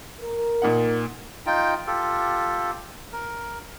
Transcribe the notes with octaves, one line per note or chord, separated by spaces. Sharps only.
A#4
A#2 D#4 F#5
D#4 F4 G5
F4 G4 A4
A#4